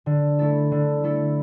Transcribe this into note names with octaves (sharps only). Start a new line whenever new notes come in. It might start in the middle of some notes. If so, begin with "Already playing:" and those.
D3
A3 E4 A4
D3
A3 E4 A4